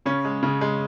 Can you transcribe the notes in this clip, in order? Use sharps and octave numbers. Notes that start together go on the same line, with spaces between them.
C#3 C#4
G#3
C#3
G#3